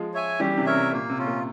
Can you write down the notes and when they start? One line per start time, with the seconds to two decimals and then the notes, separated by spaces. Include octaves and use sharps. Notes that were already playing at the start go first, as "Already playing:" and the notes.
Already playing: F3 G#3
0.14 C#5 E5 G#5
0.40 E3 G3 G4
0.57 C3 E3
0.66 A#4 C#5 E5
0.74 C3
0.92 A#2 A#3
1.09 C3
1.18 C#4 F4
1.27 A#2